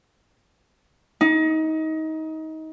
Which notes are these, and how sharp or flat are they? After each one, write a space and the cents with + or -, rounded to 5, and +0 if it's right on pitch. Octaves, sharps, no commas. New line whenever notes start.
D#4 +25